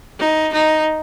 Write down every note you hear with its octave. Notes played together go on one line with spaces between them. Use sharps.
D#4
D#4